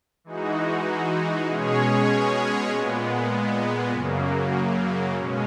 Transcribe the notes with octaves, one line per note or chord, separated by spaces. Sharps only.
E3 G#3 D#4 F#4
B2 G#3 C#4 G#4 C#5
A#2 G#3 B3
F#2 C#3 F#3 A#3
B2 G#3 C#4